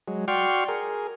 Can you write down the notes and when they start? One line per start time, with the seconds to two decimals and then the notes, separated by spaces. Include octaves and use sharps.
0.08 F#3 G#3
0.28 F#4 D5 G5 C6 C#6 F6
0.68 G#4 A#4